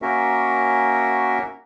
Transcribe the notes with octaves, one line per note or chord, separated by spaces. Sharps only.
A#3 C#4 F#4 A#4 E5